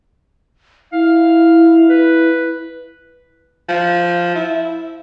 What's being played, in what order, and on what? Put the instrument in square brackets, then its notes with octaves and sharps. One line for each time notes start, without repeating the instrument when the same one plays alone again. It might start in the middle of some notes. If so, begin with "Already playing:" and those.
[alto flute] E4 [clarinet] F5
[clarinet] B4
[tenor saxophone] F3
E4